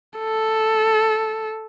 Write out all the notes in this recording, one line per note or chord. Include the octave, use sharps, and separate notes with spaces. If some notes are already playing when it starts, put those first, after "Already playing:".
A4